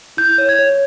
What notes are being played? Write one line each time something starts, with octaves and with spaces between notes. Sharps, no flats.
E4 G6
C#5
G#6
C#5